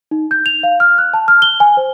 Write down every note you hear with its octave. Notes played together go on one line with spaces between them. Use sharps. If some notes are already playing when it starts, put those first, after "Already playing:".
D#4
G6
F7
F5
F6
F#6
A5
F6
G7
G#5
C5